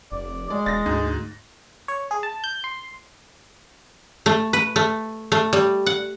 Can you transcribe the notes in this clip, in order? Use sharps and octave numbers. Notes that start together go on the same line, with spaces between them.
F1 D5
G#3 D5
E1 A6 A#6
D2 G#2
C#5
G#4
A5
G6
C6
A3
B4
A3
A3
G3
F#5